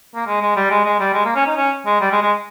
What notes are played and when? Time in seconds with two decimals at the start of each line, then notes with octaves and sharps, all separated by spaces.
0.15 A#3
0.27 G#3
0.42 G#3
0.56 G3
0.71 G#3
0.85 G#3
1.00 G3
1.14 G#3
1.25 A#3
1.36 C#4
1.47 D#4
1.57 C#4
1.87 G#3
2.01 G3
2.12 G#3
2.22 G#3